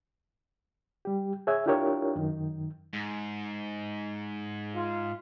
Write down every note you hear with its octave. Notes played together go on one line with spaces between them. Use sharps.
G3 G4
G#4 C#5 E5 G#5
D4 E4 F4 G4 A#4 C#5
F#2 D#3
G#2
F4